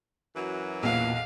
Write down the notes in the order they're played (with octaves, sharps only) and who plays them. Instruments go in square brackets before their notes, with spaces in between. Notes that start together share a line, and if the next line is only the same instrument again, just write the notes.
[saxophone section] F#2 E3 F#3
[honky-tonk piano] B1 E2 [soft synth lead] A#2 [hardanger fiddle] F5